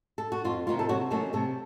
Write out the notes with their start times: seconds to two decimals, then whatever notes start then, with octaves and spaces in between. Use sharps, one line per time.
0.18 A4
0.32 F#4
0.44 F2 F4
0.67 C3 D#3 A#3 F4
0.79 A4
0.89 C3 F#3 F#4
1.11 D#3 F#3 A3 A#3 C#4 A4
1.33 C3 A3 A4